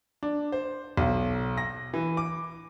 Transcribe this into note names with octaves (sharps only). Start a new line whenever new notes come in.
D4
C5
B1
A#6
E3
D6